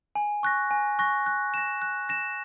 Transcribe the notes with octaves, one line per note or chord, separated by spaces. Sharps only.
G#5
C#6 F#6 A#6
G#5
C#6 F#6 A#6
F#6
A#6 E7
F#6
A#6 E7